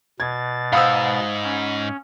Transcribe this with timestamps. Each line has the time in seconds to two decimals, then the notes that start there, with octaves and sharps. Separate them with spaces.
0.20 B2 G#6 A6
0.73 G#2 C5 F5 F#5 B5 D#6 E6
1.44 C#4